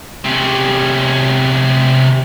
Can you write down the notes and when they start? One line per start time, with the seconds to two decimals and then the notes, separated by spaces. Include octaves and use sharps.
0.25 C3 C#4